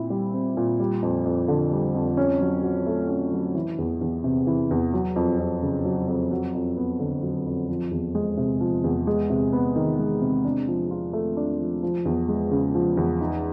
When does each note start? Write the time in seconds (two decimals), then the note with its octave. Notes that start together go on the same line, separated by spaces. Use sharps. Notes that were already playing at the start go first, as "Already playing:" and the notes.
Already playing: A#2 C4 E4
0.10 G3
0.34 C4
0.57 A#2
0.80 G3
1.02 F2
1.25 F2
1.48 D3
1.71 G3
1.95 F2
2.17 C#4
2.40 F#3
2.63 F#4
2.87 A3
3.09 C#4
3.32 F#3
3.55 E3
3.78 E2
4.01 E2
4.24 C3
4.47 E3
4.71 E2
4.94 F#3
5.16 F2
5.39 F2
5.63 C#3
5.85 F#3
6.08 F2
6.31 F#3
6.54 F2
6.77 B3
7.00 D3
7.23 F#3
7.46 F2
7.69 F3
7.91 E2
8.15 G#3
8.37 C3
8.61 F3
8.84 E2
9.07 G#3
9.30 C3
9.53 B3
9.76 D#3
9.99 G#3
10.21 C3
10.44 D4
10.68 F3
10.91 F4
11.13 A3
11.37 D4
11.59 F3
11.83 F3
12.05 E2
12.29 G#3
12.51 C#3
12.74 F3
12.97 E2
13.20 D#4